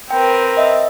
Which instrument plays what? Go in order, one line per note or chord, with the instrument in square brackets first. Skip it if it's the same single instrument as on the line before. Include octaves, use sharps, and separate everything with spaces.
[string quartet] C4 A#4 B4 [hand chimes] G5
[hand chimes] D#5 E5